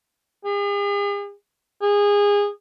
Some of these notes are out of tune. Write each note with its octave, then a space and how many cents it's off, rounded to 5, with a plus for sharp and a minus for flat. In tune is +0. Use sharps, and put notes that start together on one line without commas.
G#4 -45
G#4 -25